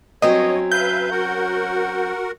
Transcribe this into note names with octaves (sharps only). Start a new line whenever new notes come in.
G2 F#3 C4 C#4 C#5 D#5
B4 E5 F5 G6
F#4 A#4 F#5